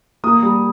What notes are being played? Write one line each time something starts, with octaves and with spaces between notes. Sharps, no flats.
A#3 D#6
G3